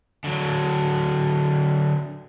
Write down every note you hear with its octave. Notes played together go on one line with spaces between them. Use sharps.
D3 F#3